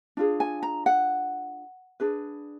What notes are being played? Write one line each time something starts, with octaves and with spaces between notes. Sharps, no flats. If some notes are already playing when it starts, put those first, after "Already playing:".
D4 F4 G#4
G#5
A#5
F#5
D4 G#4 B4